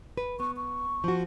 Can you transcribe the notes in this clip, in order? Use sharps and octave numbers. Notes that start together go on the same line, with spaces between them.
B4
B3 C#6
C#6
F3 F#4